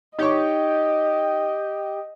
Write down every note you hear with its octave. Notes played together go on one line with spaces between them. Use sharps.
D#4 G4 C#5 D#5 C#6